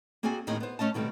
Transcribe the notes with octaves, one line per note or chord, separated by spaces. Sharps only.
A#3 C4 F#4 G#4 D5 G#5
D#2 A2 D#3 C4 G#4 D#5
B3 C5
A3 C#4 D#5 A5
B2 D#3 G3 A3 C4